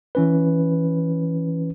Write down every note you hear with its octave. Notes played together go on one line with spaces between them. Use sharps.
E3 C#4 B4